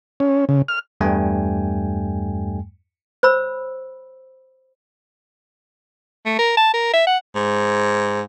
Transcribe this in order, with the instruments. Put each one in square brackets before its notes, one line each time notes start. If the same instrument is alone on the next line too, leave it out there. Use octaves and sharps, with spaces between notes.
[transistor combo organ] C#4
C#3
F6
[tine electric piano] E2 G2 G3 A3 G5 G#5
[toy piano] C5 C#5 B5 E6
[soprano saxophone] A3
A#4
A5
A#4
E5
F#5
[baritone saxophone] G#2